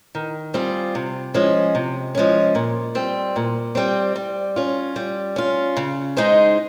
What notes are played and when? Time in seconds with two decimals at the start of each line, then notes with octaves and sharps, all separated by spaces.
0.15 D#3
0.54 G3 C4 F4 G#4
0.95 C3
1.34 F3 G#3 C#4
1.75 C3
2.15 F3 G#3 C#4
2.55 A#2
2.95 G3 C4
3.36 A#2
3.75 G3 C4
4.16 G3
4.56 C#4 F4
4.96 G3
5.36 C#4 F4
5.77 C#3
6.17 G#3 D#4 G#4 C5